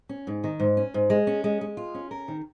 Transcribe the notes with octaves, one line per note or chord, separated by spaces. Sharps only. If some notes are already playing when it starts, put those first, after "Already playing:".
C#4
G#2
D#3
G#2
C#4
G#2
G#3
C#4
G#3
G#3
F4
C#4
A#4
D#3